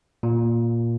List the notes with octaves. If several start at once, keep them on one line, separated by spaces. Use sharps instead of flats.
A#2